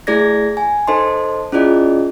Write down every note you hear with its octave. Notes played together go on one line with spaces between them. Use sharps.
A3 E4 G#4 D5 G#6 A#6
G#5
D#4 A4 C5 D#5 A5 C6
C#4 E4 F4 G#4 D5 D#5